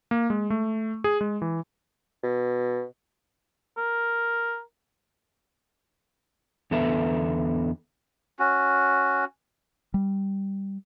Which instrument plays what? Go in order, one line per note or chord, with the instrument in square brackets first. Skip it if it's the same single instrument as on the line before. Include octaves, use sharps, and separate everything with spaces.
[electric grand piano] A#3
G#3
A3
G#4
G#3
E3
[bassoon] B2
[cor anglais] A#4
[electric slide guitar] E2 D3 B3 A4 B4 E5
[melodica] C#4 F#4
[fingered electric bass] G3